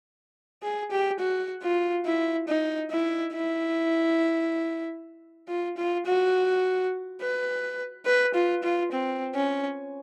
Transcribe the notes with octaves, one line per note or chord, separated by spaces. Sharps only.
G#4
G4
F#4
F4
E4
D#4
E4
E4
F4
F4
F#4
B4
B4
F4
F4
C4
C#4